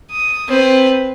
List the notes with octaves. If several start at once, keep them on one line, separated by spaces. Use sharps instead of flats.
D#6
C4 B4